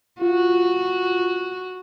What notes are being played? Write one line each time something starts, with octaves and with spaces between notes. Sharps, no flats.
F4 F#4